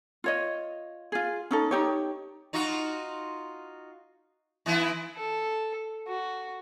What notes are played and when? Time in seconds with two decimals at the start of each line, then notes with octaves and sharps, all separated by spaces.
0.24 F4 C#5 D#5
1.12 F4 G#4
1.51 C#4 D#4 A4
1.71 D#4 G4 C#5
2.53 D#4 F4 F#4
4.66 E3 B3 E4
5.16 A4
6.08 F#4